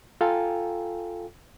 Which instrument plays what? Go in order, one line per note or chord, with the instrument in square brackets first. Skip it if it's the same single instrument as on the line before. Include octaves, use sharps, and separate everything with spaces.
[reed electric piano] F4 A4 F5 G5 G#5 A#5